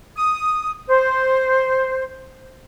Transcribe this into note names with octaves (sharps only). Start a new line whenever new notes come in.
D#6
C5